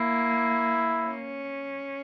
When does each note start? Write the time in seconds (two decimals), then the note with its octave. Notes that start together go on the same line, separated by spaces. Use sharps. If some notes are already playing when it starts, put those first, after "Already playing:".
Already playing: A#3 E4
1.06 C#4